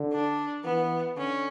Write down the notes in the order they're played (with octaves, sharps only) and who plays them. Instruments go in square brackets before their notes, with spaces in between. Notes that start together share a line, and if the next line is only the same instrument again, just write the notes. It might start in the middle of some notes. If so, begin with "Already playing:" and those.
Already playing: [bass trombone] D3
[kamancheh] D4
[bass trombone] E3 [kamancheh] B3
[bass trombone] D3 [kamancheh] C#4